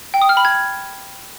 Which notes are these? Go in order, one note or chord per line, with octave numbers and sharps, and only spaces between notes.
G5
D#6
F6
B5
G#6